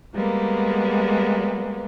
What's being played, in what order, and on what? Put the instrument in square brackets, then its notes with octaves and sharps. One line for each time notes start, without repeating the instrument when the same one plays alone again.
[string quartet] G3 G#3 A#3 B3